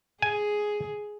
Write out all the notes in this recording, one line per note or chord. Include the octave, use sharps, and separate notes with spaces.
G#4 G#5